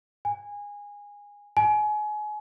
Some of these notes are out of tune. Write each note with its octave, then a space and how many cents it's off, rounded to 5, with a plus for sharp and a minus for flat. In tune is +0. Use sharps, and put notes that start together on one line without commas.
G#5 -20
G#5 +30